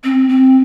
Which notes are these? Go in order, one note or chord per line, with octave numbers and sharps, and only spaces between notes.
C4
C4